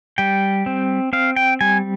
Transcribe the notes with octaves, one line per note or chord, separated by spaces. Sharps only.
G3 G5
C4
C4 F5
G5
G3 G#5